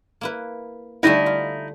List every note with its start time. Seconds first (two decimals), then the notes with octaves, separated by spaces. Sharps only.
0.21 A#3 E4 B4
1.03 D3 G3 A3 D#4 E4
1.26 F4